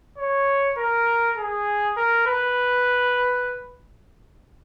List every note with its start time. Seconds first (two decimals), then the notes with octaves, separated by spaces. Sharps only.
0.18 C#5
0.78 A#4
1.37 G#4
1.97 A#4
2.27 B4